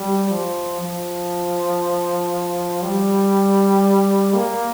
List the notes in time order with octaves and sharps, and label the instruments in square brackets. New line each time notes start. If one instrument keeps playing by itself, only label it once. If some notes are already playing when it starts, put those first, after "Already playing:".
Already playing: [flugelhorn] G3
F3
F3
G3
A#3